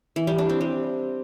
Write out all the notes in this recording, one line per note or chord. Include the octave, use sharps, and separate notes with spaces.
E3
G3
D4
C4
G3